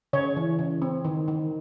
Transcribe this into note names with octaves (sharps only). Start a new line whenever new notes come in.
C#3 C#5
E3
C#3
C4
D#3
D#3